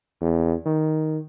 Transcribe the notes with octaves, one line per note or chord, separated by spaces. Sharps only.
E2
D#3